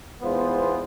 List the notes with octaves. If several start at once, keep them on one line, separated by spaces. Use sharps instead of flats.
E2 G#2 B3 F4 C5